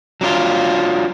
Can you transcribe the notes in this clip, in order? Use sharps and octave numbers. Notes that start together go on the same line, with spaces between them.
F#3 D4 F4